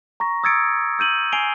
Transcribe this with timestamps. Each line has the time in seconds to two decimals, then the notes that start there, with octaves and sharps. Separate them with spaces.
0.20 A#5 C#6 A#6
0.44 D#6 E6 G#6 A6 C#7 D7
0.99 E6 G6 D#7 F#7
1.32 G#5 G#6 C7 D7 F7 G7